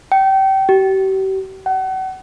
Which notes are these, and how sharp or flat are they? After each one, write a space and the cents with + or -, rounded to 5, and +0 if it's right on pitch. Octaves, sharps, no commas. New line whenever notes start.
G5 -25
G4 -40
F#5 +35